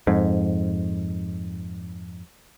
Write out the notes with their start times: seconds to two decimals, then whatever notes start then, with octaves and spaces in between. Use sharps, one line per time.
0.07 F2 G#2